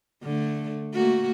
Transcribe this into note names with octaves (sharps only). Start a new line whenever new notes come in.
D3 A3
A3 A#3 F#4